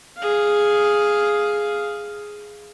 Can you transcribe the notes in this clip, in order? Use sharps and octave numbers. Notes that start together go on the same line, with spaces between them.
G#4 F5